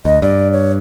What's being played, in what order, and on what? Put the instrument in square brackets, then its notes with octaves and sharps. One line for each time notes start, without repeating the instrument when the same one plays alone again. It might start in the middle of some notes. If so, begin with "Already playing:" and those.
[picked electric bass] D2 [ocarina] D#5
[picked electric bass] G2 [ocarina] D5
[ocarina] C#5